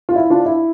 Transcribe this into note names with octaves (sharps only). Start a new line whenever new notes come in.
F4
E4
D4 F4
E4